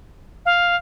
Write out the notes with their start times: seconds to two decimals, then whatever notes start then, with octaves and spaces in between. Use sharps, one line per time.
0.46 F5